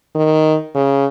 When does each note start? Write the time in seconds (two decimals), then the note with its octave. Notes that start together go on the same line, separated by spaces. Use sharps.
0.15 D#3
0.75 C#3